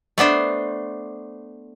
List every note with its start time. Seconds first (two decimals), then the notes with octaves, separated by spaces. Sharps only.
0.18 A3 B3 D4 C5